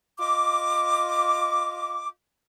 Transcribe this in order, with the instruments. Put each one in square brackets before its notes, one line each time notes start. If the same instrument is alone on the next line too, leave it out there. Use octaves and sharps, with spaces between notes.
[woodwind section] F4 D#5 D6